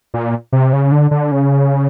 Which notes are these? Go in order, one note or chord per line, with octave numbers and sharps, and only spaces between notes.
A#2
C3
C#3
D3
D3
C#3